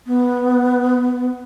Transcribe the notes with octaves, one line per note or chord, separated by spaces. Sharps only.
B3